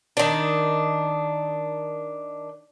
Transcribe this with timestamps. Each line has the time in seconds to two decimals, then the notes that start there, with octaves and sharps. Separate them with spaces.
0.17 D#3 D4